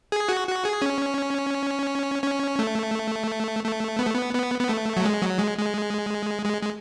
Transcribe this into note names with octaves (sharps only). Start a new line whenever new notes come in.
G#4
F#4
F#4
G#4
C#4
C#4
A3
A3
B3
A3
B3
B3
B3
A3
F#3
G#3
F#3
G#3
G#3
G#3
G#3